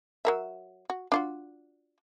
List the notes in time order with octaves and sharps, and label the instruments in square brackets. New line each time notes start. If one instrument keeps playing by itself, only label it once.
[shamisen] F#3 A#4 E5
F#4
D4 F4 F#4